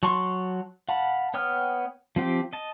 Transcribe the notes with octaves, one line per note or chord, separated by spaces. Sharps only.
F#3 A5 C6 C#6
F5 F#5 A5 B5
B3 C#5 G5 D#6 F6
F3 C4 G4
D#5 A5